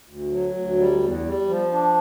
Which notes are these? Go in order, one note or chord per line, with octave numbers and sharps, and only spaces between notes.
D2
F#3
D2
G3
E2
G3
F3
D4